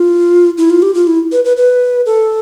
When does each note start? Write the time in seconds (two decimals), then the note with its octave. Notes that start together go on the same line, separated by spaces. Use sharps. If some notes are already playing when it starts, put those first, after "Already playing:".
Already playing: F4
0.58 E4
0.70 F4
0.82 G4
0.94 F4
1.07 E4
1.32 B4
1.44 B4
1.57 B4
2.06 A4